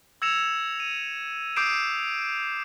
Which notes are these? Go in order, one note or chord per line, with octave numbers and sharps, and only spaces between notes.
E6 G#6 A#6 C#7 E7 F7
D#7
D6 D#6 G6 C7 D7 E7